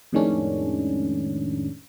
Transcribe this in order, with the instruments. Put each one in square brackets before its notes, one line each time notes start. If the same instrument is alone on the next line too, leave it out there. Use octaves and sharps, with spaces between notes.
[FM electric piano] F2 A2 D#3 G#3 C#4 D4